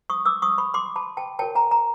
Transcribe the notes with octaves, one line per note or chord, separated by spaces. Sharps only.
C#6 D#6
D6 E6
C#6 D#6
B5 C#6
C6 D6
A5 B5
G5 A5
F#4 A#4 C#5 G5 A5
G#5 A#5
G#5 A#5